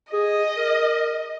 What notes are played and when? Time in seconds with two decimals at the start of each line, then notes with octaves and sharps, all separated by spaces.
0.13 G#4 D#5
0.57 A#4